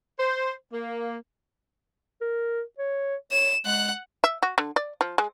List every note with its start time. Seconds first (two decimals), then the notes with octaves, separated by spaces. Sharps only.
0.19 C5
0.73 A#3
2.21 A#4
2.78 C#5
3.32 C#5 E7
3.66 G#3 F#5 F#6
4.24 E5
4.43 F#4
4.58 D3
4.76 D5
5.01 F3
5.18 G#3